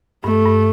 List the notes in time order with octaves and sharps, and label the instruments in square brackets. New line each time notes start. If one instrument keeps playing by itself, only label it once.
[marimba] G2 [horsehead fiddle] A3
[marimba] G2